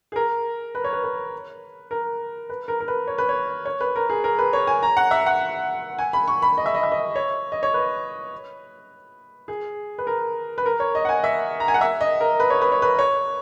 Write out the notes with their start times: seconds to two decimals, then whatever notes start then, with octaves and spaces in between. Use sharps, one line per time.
0.12 G#4
0.16 A#4
0.75 B4
0.84 C#5
0.93 B4
1.04 B4
1.91 A#4
2.49 B4
2.68 A#4
2.80 A#4
2.88 B4
3.07 C#5
3.18 B4
3.29 C#5
3.65 C#5
3.81 B4
3.96 A#4
4.09 G#4
4.24 A#4
4.39 B4
4.53 C#5
4.67 G#5
4.83 A#5
4.97 F#5
5.11 E5
5.26 F#5
5.99 G#5
6.13 B5
6.28 C#6
6.42 B5
6.58 D#5
6.66 E5
6.75 D#5
6.83 E5
6.92 D#5
7.16 C#5
7.52 D#5
7.63 C#5
7.74 B4
9.48 G#4
9.98 B4
10.07 A#4
10.58 B4
10.66 A#4
10.80 C#5
10.95 D#5
11.05 F#5
11.09 G#5
11.24 E5
11.60 A#5
11.68 G#5
11.74 F#5
11.81 E5
12.01 D#5
12.21 A#4
12.40 B4
12.50 C#5
12.62 B4
12.72 C#5
12.82 B4
12.99 C#5